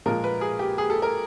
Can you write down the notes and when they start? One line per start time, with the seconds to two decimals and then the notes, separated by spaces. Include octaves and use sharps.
0.06 A#2 F3 G#3 A#4
0.24 B4
0.41 G#4
0.59 G4
0.78 G#4
0.90 A4
1.02 A#4